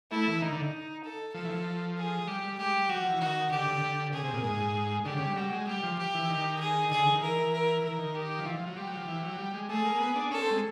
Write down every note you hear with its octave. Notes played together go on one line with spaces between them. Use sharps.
A3 E4
E3
D#3 D#4
D3
A4
F3 A4
E3
F3
G#4
G3 G4
G3
G#3 G4
G3
F#3 F#4
F3
E3
D#3 F#4
D3 G4
D3
D3
C#3 G#4
C3
A#2
G#2
D3 G4
C#3
G3
G3 F#4
G#3
G3 G4
F3
G4
E3
D#3
G#4
D3 G#4
D#3
E3 A#4
E3
A#4
E3 A#4
D#3
G4
F3
E3 F4
F3
F#3
G3 G4
F#3
F3
E3
F#3
G3
G#3
A3 G#4
A#3
B3
D4
C#4 A4
C4
G#3